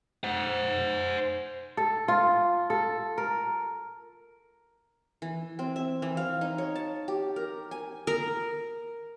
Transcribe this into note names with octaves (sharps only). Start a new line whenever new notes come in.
C5 F#5
A4
F4
A4
A#4
E3
C4
E5
E3
F5
D#4
C#5
A5
G4
A#4
G#5
A#4